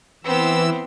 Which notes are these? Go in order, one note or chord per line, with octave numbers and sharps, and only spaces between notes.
E3 B3 C4 E6